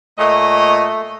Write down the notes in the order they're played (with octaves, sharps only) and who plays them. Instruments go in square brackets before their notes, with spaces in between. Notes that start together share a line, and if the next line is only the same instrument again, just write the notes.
[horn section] A#2 C#5 D#5 [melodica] A3